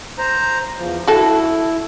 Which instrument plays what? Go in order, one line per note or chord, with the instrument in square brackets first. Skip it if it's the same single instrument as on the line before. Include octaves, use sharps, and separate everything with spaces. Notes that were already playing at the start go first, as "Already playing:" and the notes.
[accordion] C5 A#5
E2 F3
[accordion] E4 [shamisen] F#4 A4